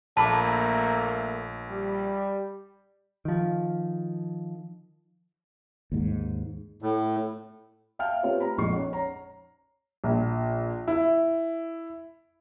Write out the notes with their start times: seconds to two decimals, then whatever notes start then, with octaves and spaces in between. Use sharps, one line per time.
0.17 A#1 A3 A#3 A5 B5 D6
1.69 G3
3.25 D#3 F3
5.92 D#2 G#2
6.82 A2
7.99 E5 F5 G5 A5 F6
8.23 A3 C4 F4 G4 B4 C#5
8.40 A#5 B5
8.58 A#1 F2 G#3 C#6 C7
8.73 C#4 D#4 F#5
8.93 C#5 A#5
10.04 A#1
10.88 E4